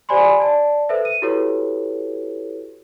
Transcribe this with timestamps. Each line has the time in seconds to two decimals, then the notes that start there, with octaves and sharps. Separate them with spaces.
0.09 G4 C5 D5 G#5 B5 C6
0.40 D5 A5
0.89 A4 B4 C5 E5
1.05 D#7
1.22 E4 F#4 G4 A4 B4 C#5